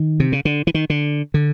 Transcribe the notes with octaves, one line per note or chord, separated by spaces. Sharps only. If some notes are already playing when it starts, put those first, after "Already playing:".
Already playing: D#3
C3
C#3
D3
E3
D#3
D3
D3